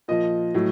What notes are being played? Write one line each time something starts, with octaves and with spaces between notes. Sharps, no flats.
A#2 F3 D#5
A2 F#3